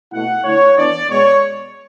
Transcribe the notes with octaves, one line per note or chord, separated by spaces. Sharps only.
B2 A3 E4 F#5
D3 A3 E4 C#5
E3 B3 D4 D5
B2 G#3 B3 C#5